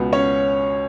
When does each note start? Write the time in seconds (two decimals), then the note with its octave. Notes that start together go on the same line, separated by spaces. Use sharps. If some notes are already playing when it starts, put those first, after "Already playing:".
Already playing: C#2 B2 B3
0.13 C#4 C#5